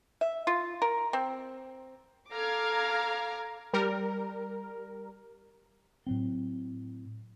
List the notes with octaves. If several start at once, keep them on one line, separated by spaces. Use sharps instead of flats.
E5
F4
A#4
C4
A4 F5 A#5 D6 F6 G#6
G3 A#4
A2 F#3 C4